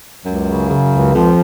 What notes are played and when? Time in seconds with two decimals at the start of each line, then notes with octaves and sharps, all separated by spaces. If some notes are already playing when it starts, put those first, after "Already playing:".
0.24 C#2 F#2
0.48 C#3
0.69 C#3
0.92 C#2
1.14 F2 F3